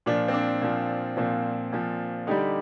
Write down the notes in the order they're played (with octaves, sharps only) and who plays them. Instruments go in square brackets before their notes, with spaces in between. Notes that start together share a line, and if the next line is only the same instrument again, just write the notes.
[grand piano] A#2 F3 D4 F4
C4
D4
A#2 F3
A#2 F3 C4
A#2 F3
D3 G3 D#4 G4